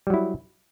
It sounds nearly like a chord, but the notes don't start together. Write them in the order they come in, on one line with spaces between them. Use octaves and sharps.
G3 F#3 E4